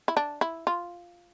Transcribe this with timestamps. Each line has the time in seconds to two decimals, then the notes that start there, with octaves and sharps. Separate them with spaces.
0.08 E4
0.17 D4
0.41 E4
0.67 F4